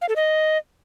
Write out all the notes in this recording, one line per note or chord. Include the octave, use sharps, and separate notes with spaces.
F5
A4
D#5